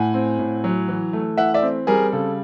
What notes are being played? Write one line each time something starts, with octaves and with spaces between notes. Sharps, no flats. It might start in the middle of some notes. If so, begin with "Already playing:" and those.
Already playing: A2 F#5 G#5
C4
A2
F#3
E3
A3
E3 E5 F#5
D5 E5
C4
G3 G#4 A#4
C#3 A4